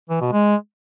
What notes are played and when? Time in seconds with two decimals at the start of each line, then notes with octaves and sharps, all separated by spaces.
0.10 E3
0.21 B2
0.32 G#3